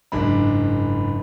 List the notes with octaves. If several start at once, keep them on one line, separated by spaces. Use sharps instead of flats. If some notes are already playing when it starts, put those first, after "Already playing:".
F#1 G#2 D4 B5